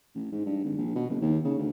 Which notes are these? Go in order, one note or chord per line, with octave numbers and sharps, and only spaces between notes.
A1
G#2
G2
G#1
A#1
B2
F#1
D#2
C#3
D2